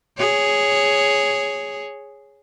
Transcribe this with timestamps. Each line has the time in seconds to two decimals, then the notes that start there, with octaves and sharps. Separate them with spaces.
0.18 G#4 C#5